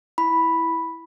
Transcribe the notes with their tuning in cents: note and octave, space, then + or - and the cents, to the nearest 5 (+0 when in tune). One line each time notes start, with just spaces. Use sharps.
E4 +0 B5 +0